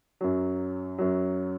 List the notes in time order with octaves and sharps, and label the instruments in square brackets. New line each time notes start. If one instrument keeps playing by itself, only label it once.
[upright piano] F#2 F#3
F#2 F#3